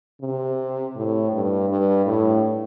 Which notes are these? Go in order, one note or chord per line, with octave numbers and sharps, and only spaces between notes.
C3
A2
G2
G2
A2